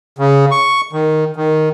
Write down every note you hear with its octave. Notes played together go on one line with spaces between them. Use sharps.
C#3
C#6
D#3
D#3